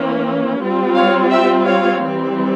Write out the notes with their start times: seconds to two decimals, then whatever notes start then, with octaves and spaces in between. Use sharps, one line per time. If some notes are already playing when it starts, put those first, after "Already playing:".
Already playing: E3 A#3 C#4
0.61 G3 C4 F4
0.95 C#5 F5
1.30 E5 G5
1.65 C#5 F5
2.00 E3 G3 C4